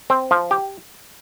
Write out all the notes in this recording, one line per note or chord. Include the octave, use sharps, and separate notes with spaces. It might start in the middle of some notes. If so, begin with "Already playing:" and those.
C4
F3
G4